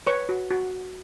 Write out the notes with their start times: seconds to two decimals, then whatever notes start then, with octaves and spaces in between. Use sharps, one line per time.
0.07 B4 C#5 C#6
0.29 F#4
0.50 F#4